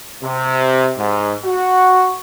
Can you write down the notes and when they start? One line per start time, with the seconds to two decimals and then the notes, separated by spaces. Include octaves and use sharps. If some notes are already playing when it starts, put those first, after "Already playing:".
0.23 C3
0.98 G#2
1.45 F#4